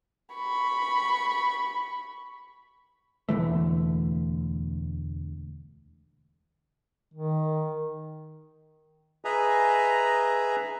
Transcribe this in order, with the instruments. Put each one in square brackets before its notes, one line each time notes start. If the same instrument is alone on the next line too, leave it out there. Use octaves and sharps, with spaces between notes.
[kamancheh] B5 C#6
[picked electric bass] E1 D2 E3 A3
[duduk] D#3
[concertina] G#4 B4 D#5 E5 G#5 A#5